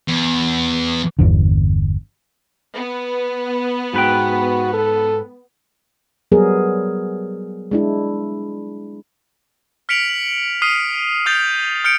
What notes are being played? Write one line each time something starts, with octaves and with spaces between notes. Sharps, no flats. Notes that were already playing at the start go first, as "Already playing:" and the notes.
E2
G1 E2 D3
B3
G#2 F#4 B4 G5
A4
F#3 G3 B3 G#4 A#4
G#3 D4 E4
F6 B6 C#7 D7 F7 F#7
F#7
D#6 F6 C7 D#7
D#6 F6 G6 A6 F7
F6 G6 C#7 D7